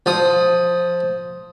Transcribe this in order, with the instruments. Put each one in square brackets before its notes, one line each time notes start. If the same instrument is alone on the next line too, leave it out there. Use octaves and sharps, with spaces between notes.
[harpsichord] F3 D#6